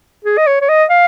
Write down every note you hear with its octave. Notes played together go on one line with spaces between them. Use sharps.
G#4
D#5
C#5
C#5
D#5
F5